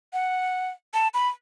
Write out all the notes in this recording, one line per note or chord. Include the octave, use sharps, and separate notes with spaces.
F#5
A5
B5